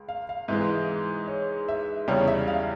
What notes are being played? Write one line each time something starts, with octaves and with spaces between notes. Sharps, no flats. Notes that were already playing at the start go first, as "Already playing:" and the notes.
Already playing: C#2
F5
F5
G#2 E3 G#3 E5
C#5
E5
E2 C#3 G3 C#5
E5
F5